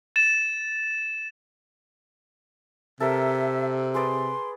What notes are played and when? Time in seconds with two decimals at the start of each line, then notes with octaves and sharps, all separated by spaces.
0.16 A6 E7
3.00 C3 A4 A#4 E5 A5
3.95 G#4 B4 D5 C6